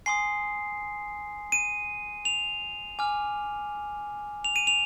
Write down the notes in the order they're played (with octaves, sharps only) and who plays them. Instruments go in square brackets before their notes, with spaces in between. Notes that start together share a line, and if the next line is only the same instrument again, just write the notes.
[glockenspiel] G#5 C6 D#6 C7
D#7
F7
G#5 D6 F6
F7
D#7
F7